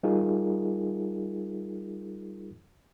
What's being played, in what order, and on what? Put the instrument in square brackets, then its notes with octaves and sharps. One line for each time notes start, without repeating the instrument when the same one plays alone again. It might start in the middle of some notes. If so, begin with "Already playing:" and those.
[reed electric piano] G3 D#4 F4 G#4 A#4